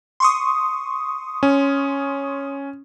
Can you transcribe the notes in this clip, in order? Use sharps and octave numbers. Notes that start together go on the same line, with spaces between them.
C6 C#6 D#6
C#4